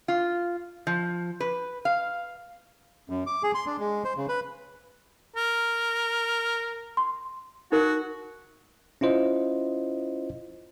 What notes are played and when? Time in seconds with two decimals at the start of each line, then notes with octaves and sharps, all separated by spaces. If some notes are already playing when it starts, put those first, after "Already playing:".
0.08 F4
0.87 F3
1.40 B4
1.85 F5
3.10 F#2
3.27 D6
3.43 G#4
3.55 C6
3.66 D4
3.80 G#3
4.05 C5
4.17 C#3
4.29 B4
5.37 A#4
6.97 C6
7.72 D#4 F#4 A#4
9.01 C#4 E4 F4 C5 D#5